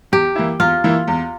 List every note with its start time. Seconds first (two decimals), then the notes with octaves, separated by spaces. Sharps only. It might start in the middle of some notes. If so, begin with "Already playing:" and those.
0.12 E2 G4
0.35 E3 A#3 E4
0.60 E2 F4
0.84 E3 A#3 E4
1.08 E2